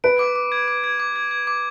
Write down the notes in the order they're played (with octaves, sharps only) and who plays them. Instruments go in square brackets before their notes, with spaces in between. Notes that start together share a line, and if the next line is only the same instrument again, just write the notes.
[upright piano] B4 [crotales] D7
[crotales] D6
D6
G#6
D6
G#6
D6
G#6
G#6
D6